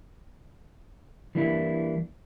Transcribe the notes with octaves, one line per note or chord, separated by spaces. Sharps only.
E3 G3 A#3 D4 E4